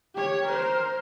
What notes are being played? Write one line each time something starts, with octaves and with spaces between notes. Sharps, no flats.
G4 C#5
A#4 C5